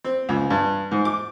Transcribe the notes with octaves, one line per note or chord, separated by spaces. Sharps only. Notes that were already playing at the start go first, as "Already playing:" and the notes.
C4
C#2
G2
G#2
D6